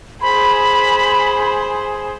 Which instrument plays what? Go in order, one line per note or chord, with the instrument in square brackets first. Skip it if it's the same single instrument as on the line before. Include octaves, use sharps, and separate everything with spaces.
[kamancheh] G#4 C5 [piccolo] B5